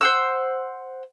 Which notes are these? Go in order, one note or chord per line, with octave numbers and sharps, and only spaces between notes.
C5 F#5 E6